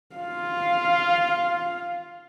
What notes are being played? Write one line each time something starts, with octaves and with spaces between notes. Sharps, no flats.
F4 F5